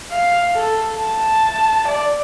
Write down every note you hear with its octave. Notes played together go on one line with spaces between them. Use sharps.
F5
A4
A5
D5